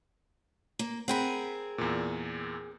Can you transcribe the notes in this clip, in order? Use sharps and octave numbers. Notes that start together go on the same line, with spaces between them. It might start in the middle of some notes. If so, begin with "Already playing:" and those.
A#3
C4 G#4 A#4 F#5 G5 B5
E2 A#2